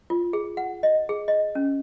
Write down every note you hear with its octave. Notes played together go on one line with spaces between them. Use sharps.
F4
G#4
F#5
D#5
G#4
D#5
C#4